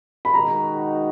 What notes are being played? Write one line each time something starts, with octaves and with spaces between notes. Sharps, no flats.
B5
D#3 G#3 D#4 F#4 A#5